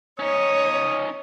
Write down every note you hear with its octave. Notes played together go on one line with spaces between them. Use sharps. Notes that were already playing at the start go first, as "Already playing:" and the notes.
C#4 D#4 C#5 D#6